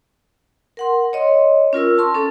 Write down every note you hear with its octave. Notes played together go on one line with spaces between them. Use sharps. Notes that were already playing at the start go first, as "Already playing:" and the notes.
A#4 F#5 C6
C#5 D#5 C6
C#4 F4 A#4 E6
A5 C6 C#6
C#4 A4